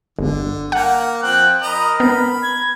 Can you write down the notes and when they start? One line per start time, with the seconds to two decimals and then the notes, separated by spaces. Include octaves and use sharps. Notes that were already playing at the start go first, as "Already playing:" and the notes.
0.19 G1 D3
0.72 A#3 F#5
1.22 F3 C4 G5 F#6
1.62 A#4 D#5 A#5 B5
2.00 B3 B5
2.43 G#6